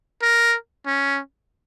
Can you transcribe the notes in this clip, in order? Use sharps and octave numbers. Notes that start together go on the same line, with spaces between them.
A#4
C#4